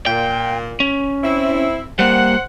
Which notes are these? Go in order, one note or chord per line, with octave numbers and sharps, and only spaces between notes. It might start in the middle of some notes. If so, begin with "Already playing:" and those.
A#2 G5
C#4
C4 E4
G3 A#3 C5 F#5